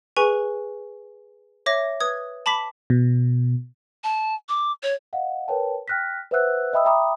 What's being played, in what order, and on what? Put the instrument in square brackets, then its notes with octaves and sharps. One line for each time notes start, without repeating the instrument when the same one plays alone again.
[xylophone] G#4 B4 G#5 C#6
C#5 E5 D6 A#6
B4 D#6 G#6
A5 B5 D6 B6
[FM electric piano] B2
[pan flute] A5
D6
C#5
[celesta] D#5 F5 F#5
A#4 B4 C#5 G5 A5
G5 F6 F#6 A#6 B6
B4 C5 E5 F#5 E6 F#6
D#5 E5 G5 B5 D#6 E6
E5 G5 A#5 B5 D6 D#6